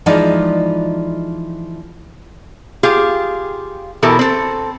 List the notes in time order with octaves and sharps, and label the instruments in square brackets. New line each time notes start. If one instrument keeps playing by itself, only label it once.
[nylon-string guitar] E3 F3 G#3 D#4 F4 D5
[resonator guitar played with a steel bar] F4 G4 G#4 F5
B2 E3 E4 G4 A4 A#4
C4 A4